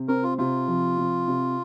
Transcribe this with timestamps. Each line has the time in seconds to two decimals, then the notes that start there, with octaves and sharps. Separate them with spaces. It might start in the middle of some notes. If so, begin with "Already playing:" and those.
Already playing: C3
0.08 C4 A#4
0.23 F4
0.38 C3 F4
0.68 F3
0.98 C3
1.28 C3